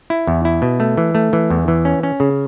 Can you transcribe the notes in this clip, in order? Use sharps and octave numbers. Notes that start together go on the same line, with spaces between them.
E4
E2
E4
B2
A3
E3
A3
E3
E2
E3
C#4
C#4
C#3